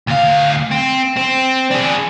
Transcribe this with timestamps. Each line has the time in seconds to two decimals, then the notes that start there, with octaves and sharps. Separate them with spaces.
0.07 D2 F5
0.71 C4
1.16 C4
1.71 D4 G#4